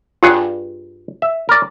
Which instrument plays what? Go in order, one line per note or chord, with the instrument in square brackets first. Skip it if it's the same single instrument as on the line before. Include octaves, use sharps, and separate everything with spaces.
[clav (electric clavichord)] G2 G#4 F#5 [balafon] F4
[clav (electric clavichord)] E5
A#4 D5